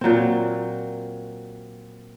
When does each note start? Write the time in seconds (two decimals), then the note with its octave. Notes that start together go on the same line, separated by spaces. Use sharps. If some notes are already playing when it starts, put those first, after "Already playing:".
0.01 A#2 F#3 C4